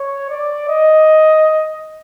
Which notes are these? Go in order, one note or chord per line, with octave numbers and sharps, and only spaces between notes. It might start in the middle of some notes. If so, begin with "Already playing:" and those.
Already playing: C#5
D5
D#5